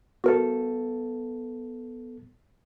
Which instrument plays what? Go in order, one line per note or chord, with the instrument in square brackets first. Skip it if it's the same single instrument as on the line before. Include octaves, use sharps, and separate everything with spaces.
[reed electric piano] B3 A4 [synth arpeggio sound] F#4 A#4